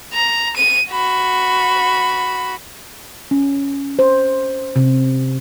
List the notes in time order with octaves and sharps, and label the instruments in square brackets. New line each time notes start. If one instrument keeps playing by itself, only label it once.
[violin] A#5
D#7
F#4 B5
[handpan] C#4
C5
C3